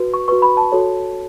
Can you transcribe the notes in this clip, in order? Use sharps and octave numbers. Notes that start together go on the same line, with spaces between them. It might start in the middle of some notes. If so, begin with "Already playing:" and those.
Already playing: F#4 B4
C#6
F#4 B4 C#6
B5
A5
F#4 A4 C#5